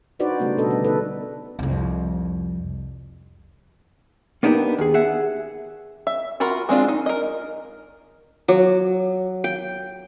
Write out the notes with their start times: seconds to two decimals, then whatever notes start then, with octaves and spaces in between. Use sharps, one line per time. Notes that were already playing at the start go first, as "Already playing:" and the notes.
0.19 D4 D#4 F#4 B4 C5 D5
0.40 C#3 G3 A3 B3
0.57 B2 D4 A4 D#5
0.70 D3 B3
0.84 B3 D#4 A4 B4
1.59 C2 F2
4.43 A#3 B3 D4 D#4 G4 A#4
4.79 D#2 G#4
4.94 G#4 E5 F#5
6.07 E5
6.40 F4 F#4 A#4 B5
6.69 G#3 C4 D4 F4
6.88 D#4
7.06 A#4 D#5
8.48 F#3
9.44 G5